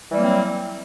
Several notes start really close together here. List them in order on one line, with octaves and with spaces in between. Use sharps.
E3 G3 A#3 F#3 C4